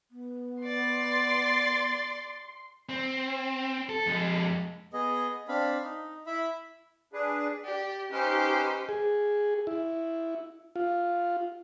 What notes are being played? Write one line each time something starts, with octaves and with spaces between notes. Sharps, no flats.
B3
D5 C6 A6
C4
A4
F2 G#3
B3 G#4 D#5
C4 D4 F5 B5
D#4
E4 E5 B5
D4 G#4 B4
G4 D5
C#4 D#4 G4 B4 C5
G#4
E4
F4